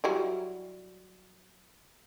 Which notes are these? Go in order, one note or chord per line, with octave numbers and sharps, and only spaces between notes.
F#3 G3 E4